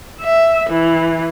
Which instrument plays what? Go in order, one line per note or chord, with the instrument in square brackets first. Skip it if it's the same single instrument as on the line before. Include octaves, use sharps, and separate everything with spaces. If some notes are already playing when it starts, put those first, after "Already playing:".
[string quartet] E5
E3